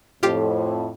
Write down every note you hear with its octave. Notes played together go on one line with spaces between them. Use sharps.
F2 A2 F4 G4